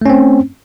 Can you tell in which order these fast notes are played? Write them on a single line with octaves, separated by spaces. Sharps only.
A3 C#4 C4